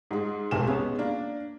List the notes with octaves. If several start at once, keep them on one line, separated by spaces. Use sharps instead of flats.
G#2 G#3
F1 B1 C3 G#5 E7
G#3 B3 C#4
A#3 D4